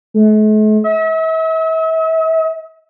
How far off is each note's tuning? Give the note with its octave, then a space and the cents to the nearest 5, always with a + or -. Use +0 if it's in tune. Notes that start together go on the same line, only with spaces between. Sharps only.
A3 -45
E5 -40